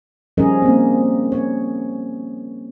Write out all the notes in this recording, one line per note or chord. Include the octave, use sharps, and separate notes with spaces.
F3 G3 C#4 G#4 A#4 D#5
A#3 C4
C#5